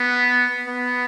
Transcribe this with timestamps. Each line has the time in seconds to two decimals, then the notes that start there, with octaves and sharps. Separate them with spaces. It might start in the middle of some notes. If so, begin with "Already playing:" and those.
Already playing: B3
0.68 B3